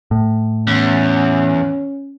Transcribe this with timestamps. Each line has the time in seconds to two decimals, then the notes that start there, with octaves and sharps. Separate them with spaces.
0.11 A2
0.67 E2 C#4